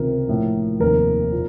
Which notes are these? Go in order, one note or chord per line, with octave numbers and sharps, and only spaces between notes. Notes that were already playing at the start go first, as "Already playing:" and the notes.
Already playing: C#2 C3 D#3 A#4
A#1 A2
F1 D#2 D#3 A#4
A#2